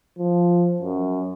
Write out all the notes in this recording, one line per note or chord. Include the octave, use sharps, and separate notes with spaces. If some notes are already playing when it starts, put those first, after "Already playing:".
F3
F#2